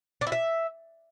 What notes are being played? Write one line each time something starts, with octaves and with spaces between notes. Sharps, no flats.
D4
E4
E5